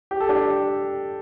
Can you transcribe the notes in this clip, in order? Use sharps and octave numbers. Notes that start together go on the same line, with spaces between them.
G4
A4
D4 G4